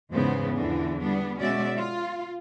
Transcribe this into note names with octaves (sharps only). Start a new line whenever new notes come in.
E2 G#2 C#3 B3 C5
E2 D3 E3 F3 D4
G3 B3 D4
B2 G#3 C#4 F#4 D5 E5
F4